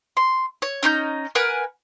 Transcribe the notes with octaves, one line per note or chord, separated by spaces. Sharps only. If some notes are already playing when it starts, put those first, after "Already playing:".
C6
C#5
C#4 D#4 C6 G6
A#4 B4 F#5 G#5